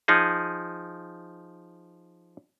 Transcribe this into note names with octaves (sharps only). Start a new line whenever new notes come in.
F3 D#4 G#4